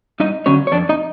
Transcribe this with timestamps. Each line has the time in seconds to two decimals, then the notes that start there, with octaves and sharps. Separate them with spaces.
0.20 G2 D#4 D#5
0.46 D3 F#3 C#4 C#5
0.67 C#5
0.72 F2 D4 D5
0.89 D#4 D#5